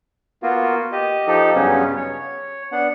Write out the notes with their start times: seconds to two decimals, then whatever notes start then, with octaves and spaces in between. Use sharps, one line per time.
0.43 A#3 B3 F4 F#4
0.92 G4 D#5
1.27 F3 D#4 G4 A4
1.55 G2 C#3 F#3 B3 C#4
1.97 C#5
2.72 B3 D4 F#5